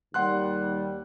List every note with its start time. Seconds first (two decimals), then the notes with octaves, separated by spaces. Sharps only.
0.14 D#2 G3 F#5 C6 F#6